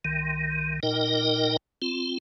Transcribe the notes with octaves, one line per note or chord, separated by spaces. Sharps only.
C2 D#3
A#2 D#4 A#4 D#5 G5
C4 F4